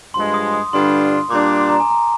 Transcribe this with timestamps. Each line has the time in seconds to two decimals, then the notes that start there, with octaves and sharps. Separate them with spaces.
0.14 G2 F3 G#3 C6
0.34 D#6
0.54 D#6
0.73 G2 D3 G3 D4 F4 C6
1.30 A#2 G3 D4 D6
1.59 C6
1.69 A#5
1.80 G#5
1.90 A#5